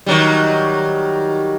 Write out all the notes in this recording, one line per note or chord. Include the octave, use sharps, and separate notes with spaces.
D#3 F#3 G3